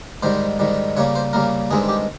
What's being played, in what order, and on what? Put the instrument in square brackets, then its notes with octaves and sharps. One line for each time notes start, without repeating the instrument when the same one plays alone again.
[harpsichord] G#2 D#3 G3 C5
G#2 D#3 G3
C#3 G3 A#3 C#5
C5
C#3 G3 A#3 A#4
G2 D#3 G#3 C4 G#4
G4